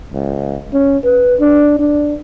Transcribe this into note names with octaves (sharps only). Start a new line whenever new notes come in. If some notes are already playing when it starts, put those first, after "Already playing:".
C#2
C#4
B4
D4
D4